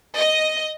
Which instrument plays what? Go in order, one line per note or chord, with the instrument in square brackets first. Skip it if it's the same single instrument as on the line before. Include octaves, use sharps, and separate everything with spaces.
[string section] D#5